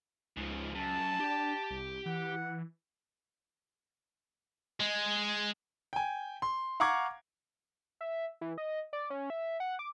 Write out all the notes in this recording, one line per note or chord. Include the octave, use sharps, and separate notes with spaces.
C#2 G#2 F3
F#2 A5
D4 G4 G5
C2
E3 F#5
G#3
G5 G#5
C6
F5 F#5 A#5 C#6 D6 G#6
E5
E3
D#5
D5
C#4
E5
F#5
D6